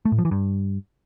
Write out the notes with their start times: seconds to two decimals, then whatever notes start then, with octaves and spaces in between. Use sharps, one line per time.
0.05 A3
0.12 A2
0.18 F3
0.25 E3
0.31 G2